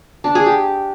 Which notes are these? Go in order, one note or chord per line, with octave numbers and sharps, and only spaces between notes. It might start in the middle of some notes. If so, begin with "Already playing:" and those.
D4
G#4
G4